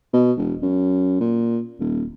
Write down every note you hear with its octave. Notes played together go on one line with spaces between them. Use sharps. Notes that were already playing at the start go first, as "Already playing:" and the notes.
B2
E1
F#2
A#2
D#1